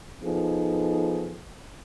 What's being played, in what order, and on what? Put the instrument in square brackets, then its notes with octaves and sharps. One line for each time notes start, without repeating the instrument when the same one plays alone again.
[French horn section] F3 B3 D#4 G#4 A4